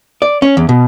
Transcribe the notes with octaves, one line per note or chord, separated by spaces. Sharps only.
D5
C#4
E2
B2